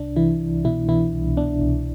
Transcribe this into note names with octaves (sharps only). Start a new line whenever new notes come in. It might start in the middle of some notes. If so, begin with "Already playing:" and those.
Already playing: C2 D4
C2 E3 E4
C2
B2 E3 E4
B2 E3 E4
C2
B2 D4
C2